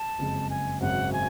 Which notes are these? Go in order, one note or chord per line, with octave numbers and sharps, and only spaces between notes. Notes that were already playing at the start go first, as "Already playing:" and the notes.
Already playing: A5
F#1 F2 C#3 G#3
G#5
G#1 F#2 C#3 F#5
G#5